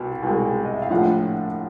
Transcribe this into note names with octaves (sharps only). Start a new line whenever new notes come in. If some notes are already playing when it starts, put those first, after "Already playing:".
Already playing: C2 B2
C2 B2 G#3
D#5
E5
F5
A#1 A2 F3 F#5